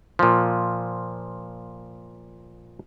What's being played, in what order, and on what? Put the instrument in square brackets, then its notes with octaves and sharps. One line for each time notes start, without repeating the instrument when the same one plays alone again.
[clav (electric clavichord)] A#2 F3